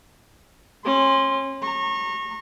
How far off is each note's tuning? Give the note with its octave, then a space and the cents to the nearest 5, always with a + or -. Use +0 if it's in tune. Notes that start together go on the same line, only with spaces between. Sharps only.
C#4 -35 C6 +0
A#5 -20 C#6 -30